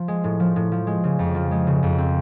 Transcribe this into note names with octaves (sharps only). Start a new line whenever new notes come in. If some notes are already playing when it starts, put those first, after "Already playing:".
Already playing: F3
G#3
A2
F3
A2
F3
G#3
C#3
F2
F3
G#3
C#3
F2
C4